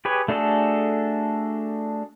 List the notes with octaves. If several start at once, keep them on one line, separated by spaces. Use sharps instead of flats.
G4 G#4 B4 C#5
A3 D4 F#4 G#4 A4